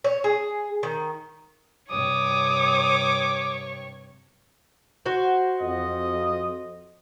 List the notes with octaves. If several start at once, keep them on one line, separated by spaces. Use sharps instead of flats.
C#5
G#4
D#3
G2 C3 C#5 D6 D#6
F#4 C5
F2 D#5